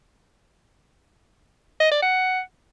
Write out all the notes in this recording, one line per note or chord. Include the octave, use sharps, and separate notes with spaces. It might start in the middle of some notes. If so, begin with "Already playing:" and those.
D#5
D5
F#5